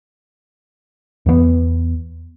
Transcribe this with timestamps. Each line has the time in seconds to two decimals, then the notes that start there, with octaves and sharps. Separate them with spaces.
1.26 E2 E3 A3 B3